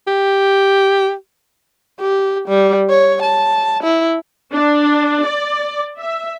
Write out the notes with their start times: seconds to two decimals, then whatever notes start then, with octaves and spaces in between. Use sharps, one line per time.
0.07 G4
2.00 G4
2.48 G3
2.90 C#5
3.22 A5
3.84 E4
4.53 D4
5.24 D5
6.00 E5